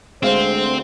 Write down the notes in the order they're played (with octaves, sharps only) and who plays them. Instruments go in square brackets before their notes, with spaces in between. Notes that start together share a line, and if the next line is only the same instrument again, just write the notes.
[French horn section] D2 C5 [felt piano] G#3 F5 [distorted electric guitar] C4